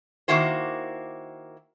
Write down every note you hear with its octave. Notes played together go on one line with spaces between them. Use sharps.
D#3 A#3 E4 F#4 C5